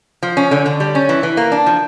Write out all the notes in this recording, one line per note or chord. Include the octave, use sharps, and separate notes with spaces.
F3
C#4
D3
D3
G3
C#4
E3
E3
A#3
D4
F3